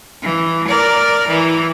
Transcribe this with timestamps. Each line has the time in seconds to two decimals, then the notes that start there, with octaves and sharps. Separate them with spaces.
0.22 E3
0.68 A#4 D5
1.28 E3